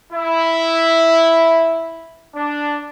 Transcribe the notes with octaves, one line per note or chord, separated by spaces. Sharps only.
E4
D4